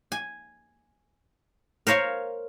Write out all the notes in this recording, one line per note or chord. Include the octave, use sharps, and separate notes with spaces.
G#5
A#4 C5 C#5 F5